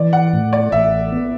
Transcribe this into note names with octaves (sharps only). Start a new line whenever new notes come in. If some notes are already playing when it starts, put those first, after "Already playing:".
Already playing: E3 D5
F#5
A2
D5
A1 E5
B3